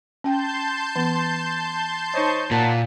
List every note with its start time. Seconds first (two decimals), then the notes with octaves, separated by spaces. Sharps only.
0.24 C#4 G5 A5 C6 G6
0.96 E3 B3
2.14 D#4 C5 C#5 D#5 C#6
2.51 A#2 A#4 F#5 A5